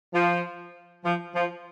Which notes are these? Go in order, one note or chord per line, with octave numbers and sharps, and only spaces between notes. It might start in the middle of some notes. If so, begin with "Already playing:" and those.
F3
F3
F3